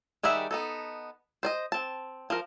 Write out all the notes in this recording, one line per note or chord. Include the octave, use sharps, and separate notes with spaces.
D#3 G3 G#4 E5 F#5
B3 D#4 A4
C5 D5 D#5
C4 A5
F3 A#4